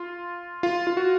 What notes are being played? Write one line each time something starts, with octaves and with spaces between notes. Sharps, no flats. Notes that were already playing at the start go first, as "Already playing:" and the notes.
Already playing: F4
F4
F4
F#4